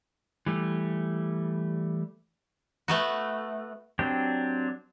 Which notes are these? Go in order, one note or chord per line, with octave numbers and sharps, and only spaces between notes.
E3 G3 A3
A3 B3 F#4
F#3 C4 D4 G4